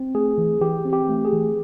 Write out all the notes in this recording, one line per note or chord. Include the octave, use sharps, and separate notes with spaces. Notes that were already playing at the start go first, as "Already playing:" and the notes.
Already playing: C4
A3 G#4
E3
E3 G4
C4
G4
A3
G#4
E3